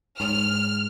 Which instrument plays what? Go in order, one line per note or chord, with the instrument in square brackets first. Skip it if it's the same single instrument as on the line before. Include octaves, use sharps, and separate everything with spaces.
[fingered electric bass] G#2 [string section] F6